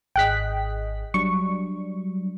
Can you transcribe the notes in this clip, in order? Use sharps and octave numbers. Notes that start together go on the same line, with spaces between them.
G#1 G#4 D#5 G5 F#6 B6
F#3 G3 D4 C#6